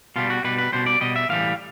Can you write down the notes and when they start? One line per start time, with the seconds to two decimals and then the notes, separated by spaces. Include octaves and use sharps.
0.16 B2 G3 F4
0.30 F#4
0.44 B2 G3 B4
0.58 B4
0.72 B2 G3 C5
0.86 D5
1.01 B2 G3 D#5
1.16 E5
1.29 A2 E3 G3 F5